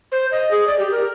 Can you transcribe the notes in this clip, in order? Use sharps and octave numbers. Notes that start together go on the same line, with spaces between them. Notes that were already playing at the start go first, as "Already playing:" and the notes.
C5
D#5
G#4
D5
G4
A#4